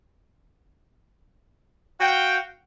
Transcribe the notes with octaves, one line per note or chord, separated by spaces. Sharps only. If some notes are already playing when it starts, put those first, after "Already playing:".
F#4 F5 G5